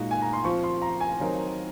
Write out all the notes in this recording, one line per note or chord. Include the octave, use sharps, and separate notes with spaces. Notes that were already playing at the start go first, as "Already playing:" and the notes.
Already playing: A#2 G#3 D#4 F#4
G#5
A#5
C6
F3 C4 F4 C#6
C6
A#5
G#5
D#3 F#3 C4 D#4 A#4